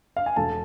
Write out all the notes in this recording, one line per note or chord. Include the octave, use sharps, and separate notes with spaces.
F5
G#5
E1 A4 A5